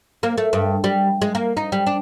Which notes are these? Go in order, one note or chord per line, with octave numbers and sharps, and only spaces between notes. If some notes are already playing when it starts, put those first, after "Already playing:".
A#3
A3
G2
G3
G#3
A#3
D#4
G3
D4